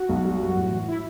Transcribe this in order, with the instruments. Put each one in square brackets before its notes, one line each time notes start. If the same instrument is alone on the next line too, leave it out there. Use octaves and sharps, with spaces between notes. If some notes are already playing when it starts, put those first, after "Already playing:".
Already playing: [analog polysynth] F#4
[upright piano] B1
G3
F#2
A2
E3
[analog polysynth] E4